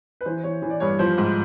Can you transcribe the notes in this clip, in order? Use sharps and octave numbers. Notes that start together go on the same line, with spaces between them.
B4
E3 C5
E3 C#5
E3
D5
G2 C#5
F3 C5
G#2